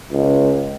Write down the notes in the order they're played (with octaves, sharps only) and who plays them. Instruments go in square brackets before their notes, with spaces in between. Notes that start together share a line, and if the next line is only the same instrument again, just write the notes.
[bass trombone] C#2